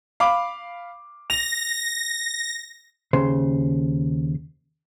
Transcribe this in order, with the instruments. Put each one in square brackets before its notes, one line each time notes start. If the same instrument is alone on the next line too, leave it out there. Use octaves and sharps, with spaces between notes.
[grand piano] F5 B5 D6
[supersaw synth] A#6 [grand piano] F7
[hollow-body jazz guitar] D#2 C#3 C5 C6